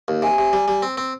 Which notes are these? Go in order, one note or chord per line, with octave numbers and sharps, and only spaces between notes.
D#2
C3 G#5
C3
G3
G3
C4
C4